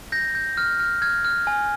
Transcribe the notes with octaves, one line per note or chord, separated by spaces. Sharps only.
G6 A#6
G6
F6
F6
F6 G#6
F6
G#5